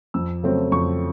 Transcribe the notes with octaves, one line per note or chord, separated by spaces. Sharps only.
F2 E6
C#3 F#3 A3 C4
F2 C#6